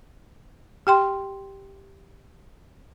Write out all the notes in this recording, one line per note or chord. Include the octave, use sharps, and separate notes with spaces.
G4 G5 C6